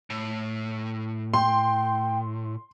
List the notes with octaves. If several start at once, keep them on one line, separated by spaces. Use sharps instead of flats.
A2
G5 C6